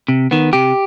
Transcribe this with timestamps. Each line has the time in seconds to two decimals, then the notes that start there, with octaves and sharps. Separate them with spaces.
0.09 C3
0.31 D#3 B3
0.53 C3 G4